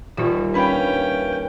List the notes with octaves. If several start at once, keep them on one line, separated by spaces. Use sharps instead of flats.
D#1 F4 G4
C#4 D4 B4 F5 G5 B5